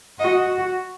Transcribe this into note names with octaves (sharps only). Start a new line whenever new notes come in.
F#4 D#5